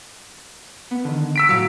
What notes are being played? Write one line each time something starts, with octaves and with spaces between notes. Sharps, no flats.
B3
D3 D#3
E6 B6 D7
A2 F#3 F5 C#7